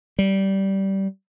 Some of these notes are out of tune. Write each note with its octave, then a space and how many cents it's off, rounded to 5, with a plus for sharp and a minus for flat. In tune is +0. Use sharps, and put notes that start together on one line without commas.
G3 -15